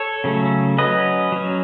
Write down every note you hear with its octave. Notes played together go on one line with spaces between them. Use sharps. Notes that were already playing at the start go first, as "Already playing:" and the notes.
Already playing: A4 C#5
C#3 F#3 A3 C#4
F#3 C#4 B4 D#5
F#3 C#4